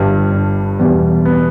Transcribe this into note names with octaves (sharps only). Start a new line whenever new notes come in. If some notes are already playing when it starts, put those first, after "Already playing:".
Already playing: G1 G2 G3
D4
E2 B2 G3
B3